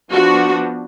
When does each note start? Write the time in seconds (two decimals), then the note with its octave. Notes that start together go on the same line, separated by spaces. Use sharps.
0.11 F3 B3 D4 F#4